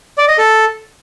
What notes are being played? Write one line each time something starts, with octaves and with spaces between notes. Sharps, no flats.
D5
D#5
A4